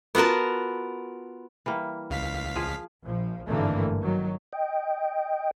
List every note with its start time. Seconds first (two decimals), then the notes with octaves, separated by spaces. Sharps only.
0.15 B3 F4 F#4 A#4 A5
1.66 E3 G3 A#3
2.10 C#2 F5 B6
2.55 F3 G#4
3.04 A#1 F3
3.48 G#1 G2 D3 E3 A3 A#3
4.02 D#3 F#3
4.53 D#5 G5